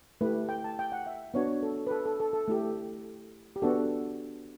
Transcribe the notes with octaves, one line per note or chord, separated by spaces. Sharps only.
A3 E4 G4 B4
G5
A5
G5
F#5
E5
B3 D4 F#4 C#5
A4
B4
A4
A4
A4
A4
A3 E4 G4
G4
B3 D4 F#4 A4